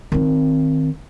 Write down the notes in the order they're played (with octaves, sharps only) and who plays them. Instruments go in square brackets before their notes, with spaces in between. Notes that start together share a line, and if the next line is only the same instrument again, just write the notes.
[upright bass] D#3 C4